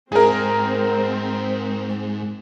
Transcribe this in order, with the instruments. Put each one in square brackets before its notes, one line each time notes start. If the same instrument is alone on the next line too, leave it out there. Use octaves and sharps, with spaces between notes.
[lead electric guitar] G#2 [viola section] C4 [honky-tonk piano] G#4 A#4